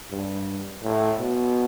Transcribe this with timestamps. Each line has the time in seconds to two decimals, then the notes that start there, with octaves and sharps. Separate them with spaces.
0.11 G2
0.83 A2
1.19 B2